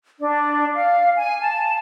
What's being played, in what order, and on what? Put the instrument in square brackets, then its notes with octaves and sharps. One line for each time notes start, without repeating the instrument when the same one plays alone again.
[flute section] D4
F5
G#5
A5